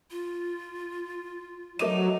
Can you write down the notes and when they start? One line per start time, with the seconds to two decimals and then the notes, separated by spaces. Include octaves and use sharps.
0.11 F4
1.79 F#3 A3 D#4 D6 D#7